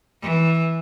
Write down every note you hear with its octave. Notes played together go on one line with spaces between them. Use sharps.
E3